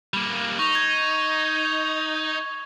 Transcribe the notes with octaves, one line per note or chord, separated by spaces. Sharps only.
G3 A#3
D#4 C#6 F7
G#6